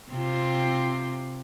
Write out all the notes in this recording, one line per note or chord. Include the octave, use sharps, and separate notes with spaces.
C3 C4 F4